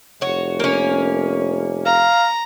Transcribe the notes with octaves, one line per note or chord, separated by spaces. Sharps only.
F1 F#4 C#5
A#3 C#4
F5 A#5